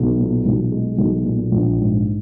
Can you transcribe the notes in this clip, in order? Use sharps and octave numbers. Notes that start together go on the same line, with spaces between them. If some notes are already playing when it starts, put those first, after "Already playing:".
Already playing: B1
A#2
B1
G#3
B1
A#2
A#1
G#2